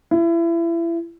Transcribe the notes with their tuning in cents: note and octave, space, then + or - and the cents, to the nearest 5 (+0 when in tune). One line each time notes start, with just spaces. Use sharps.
E4 +30